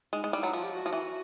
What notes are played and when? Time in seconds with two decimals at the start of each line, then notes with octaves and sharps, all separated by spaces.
0.13 G#3 D#4
0.24 G#3
0.33 G3 E4
0.43 F#3
0.53 F3 F4
0.63 G4
0.72 F#4
0.86 F3
0.93 E3